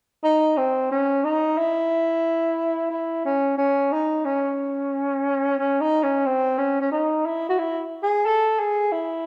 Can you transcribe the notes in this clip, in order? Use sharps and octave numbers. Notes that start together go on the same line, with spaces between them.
D#4
C4
C#4
D#4
E4
E4
C#4
C#4
D#4
C#4
C#4
D#4
C#4
C4
C#4
C#4
D#4
E4
F#4
E4
G#4
A4
G#4
E4